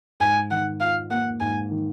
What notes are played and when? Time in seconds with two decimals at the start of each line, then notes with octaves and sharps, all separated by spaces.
0.20 G#2 G#5
0.51 D#3 F#5
0.80 F4 F5
1.11 A#3 F#5
1.40 G#2 G#5
1.71 D#3